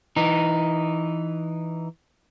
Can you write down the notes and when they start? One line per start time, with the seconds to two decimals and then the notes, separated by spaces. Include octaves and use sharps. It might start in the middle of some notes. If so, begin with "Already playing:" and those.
0.16 E3 D#4